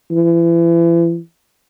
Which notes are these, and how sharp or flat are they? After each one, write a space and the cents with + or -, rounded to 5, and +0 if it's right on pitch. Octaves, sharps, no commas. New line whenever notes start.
E3 +35